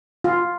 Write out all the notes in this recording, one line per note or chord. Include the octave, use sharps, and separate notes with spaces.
F4